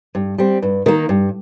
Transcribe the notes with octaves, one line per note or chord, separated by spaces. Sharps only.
G2
G3 C4
G2
D#3 A#3
G2